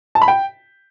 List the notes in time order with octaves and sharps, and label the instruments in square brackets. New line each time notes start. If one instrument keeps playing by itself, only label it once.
[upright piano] A5
B5
G5